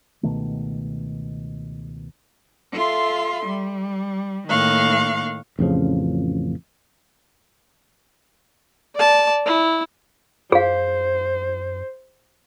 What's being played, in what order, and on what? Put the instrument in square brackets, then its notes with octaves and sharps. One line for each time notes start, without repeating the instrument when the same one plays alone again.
[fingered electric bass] C#2 B2 D#3 A3
[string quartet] F4 A4 E5 C6
G3
A2 D#3 A#3 F5 C#6 F#6
[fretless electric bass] A1 F2 C#3 F3
[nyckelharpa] D5 A5
E4
[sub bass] F#2 [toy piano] G#4 F5 [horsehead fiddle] C5